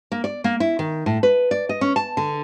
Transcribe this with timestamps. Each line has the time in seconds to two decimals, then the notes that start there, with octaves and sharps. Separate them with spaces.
0.12 A#3
0.24 D5
0.44 A#3
0.60 E4
0.79 D#3
1.06 A2
1.23 B4
1.51 D5
1.69 D#5
1.81 C#4
1.96 A5
2.17 D3